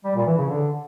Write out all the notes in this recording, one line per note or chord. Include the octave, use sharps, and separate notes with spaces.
G3
A#2
E3
C#3
D3